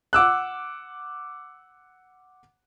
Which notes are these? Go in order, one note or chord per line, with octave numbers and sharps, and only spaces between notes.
F#5 D6 E6 F#6